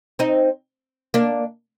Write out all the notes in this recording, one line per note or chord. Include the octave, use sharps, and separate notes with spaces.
C4 D#4
A#3 D4